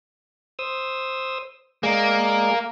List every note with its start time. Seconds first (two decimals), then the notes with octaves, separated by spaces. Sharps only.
0.59 C5 D#6 E6
1.83 G#3 A#3 G#4 D5